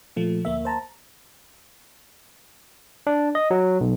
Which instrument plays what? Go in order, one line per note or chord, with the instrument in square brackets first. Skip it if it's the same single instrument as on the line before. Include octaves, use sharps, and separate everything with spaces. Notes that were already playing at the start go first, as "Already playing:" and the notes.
[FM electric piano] A#2 F3 A3
D2 A#3 E5
C5 A5 A#5
[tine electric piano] D4
D#5
F#3
B1